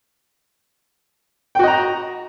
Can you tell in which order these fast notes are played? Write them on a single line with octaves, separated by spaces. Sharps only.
G5 F#4 D#5 A#5